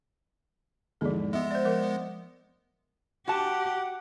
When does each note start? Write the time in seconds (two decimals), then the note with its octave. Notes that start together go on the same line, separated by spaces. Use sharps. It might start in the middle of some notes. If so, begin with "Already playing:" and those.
1.01 E2 G#2 F3 A4
1.33 G#3 B3 E5
1.51 C5 D5
1.65 F3 A#4 F#5
3.28 F#4 G4 F#5 A5